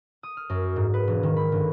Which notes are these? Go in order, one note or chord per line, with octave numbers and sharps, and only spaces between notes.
D#6
F6
F#2
G#2
B4
E1
D#3
B5
G1